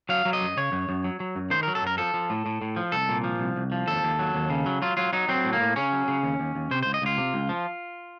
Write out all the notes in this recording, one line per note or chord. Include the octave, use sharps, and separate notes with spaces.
F#3 F5
F#3
D#5
F#2
C#3 C#5
F#2
F#2
F#3
F#3
F#2
D#3 C5
F#3 A#4
A4
F#2 A#4
F3 A4
F3
A2
A2
A2
F3
C2 A4
A#2
F3
C2
C2
F3
D#2 A4
D#2
F#3
D#2
C#3
F#3
F#3 F4
F#3 F4
F#3 D#4
F#3 C4
A2
A#3
A2
C#3 C#4
F#3
C#3
D#2
D#2
D#2
C3 C5
C#2 C5
D#5
C#2 F4
C3
C#2
F3